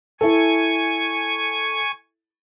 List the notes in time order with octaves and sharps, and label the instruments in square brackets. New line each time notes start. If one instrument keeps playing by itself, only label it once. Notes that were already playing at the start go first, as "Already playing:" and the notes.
[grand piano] E4 A4 [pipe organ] G#5 C#6